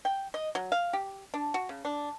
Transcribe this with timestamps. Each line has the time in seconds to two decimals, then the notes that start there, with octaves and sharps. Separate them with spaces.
0.05 G5
0.34 D#5
0.55 F#3
0.72 F5
0.93 G4
1.34 D4
1.54 F#4
1.69 C#3
1.85 D4